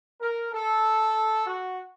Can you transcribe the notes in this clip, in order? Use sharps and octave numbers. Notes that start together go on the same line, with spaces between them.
A#4
A4
F#4